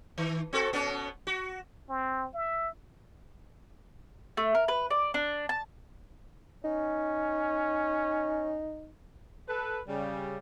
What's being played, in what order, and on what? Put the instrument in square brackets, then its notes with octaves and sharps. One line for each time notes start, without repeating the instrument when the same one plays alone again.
[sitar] D#3
C4 F#4 A4
B2 B3 C#4
F#4
[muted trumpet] C4
E5
[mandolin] A3
A#4
B4
D5
D4
A5
[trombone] C#4 [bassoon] D#4
[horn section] A4 B4
C#3 G3